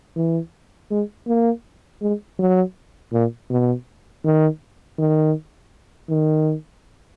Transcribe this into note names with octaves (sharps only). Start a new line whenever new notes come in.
E3
G#3
A#3
G#3
F#3
A#2
B2
D#3
D#3
D#3